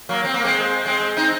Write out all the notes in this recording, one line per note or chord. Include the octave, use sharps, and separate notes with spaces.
F#3 A#3
C4
A#3
G#3 C4
G#3 C4
C4 D#4